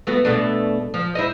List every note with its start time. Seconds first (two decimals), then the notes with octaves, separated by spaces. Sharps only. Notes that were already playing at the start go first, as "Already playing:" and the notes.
0.07 A3 B3 F#4
0.25 B2 A3 D4
0.94 F3
1.15 E4 C5 D#5